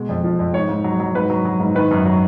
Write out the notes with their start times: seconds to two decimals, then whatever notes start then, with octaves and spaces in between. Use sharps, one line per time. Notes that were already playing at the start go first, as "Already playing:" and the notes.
Already playing: B2 G#3
0.09 F2
0.24 F3
0.39 F2
0.53 G#2 C#5
0.69 G#2
0.84 F#3
1.00 F#3
1.15 G#2 B4
1.30 F#3
1.45 F#3
1.60 G#2
1.75 D#3 B4
1.91 F#2
2.06 F#3